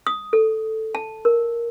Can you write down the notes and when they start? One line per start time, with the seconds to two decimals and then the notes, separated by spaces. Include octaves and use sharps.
0.07 D#6
0.33 A4
0.95 A5
1.25 A#4